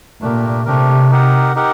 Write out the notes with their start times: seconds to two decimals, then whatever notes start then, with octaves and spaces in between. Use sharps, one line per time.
0.21 A#2 A3 D4 G4 A#4
0.65 C3 A3 D4 G4 A#4
1.11 D#4 G4 A#4 F#5
1.55 D#4 G4 A#4 F#5